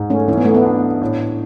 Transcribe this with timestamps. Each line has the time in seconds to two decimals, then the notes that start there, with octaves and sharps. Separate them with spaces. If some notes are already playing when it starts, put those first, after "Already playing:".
Already playing: G#2 G#4
0.10 A3 C#4
0.28 E3 C#4
0.38 B3
0.45 A3
0.54 B3
0.65 D4
1.01 A2